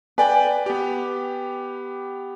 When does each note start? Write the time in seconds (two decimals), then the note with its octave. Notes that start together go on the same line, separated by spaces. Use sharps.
0.18 B4 D5 G5 G#5
0.66 B3 G4